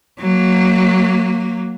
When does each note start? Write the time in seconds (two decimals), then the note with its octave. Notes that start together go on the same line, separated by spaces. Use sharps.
0.20 F#3 A#3